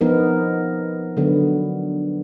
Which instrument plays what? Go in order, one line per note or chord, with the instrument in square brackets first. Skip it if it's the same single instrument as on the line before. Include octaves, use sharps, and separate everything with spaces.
[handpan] F3 B3 D#4 A#4
D3 F#3 B3